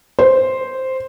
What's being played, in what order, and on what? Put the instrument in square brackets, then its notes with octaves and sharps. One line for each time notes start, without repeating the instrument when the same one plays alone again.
[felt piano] C5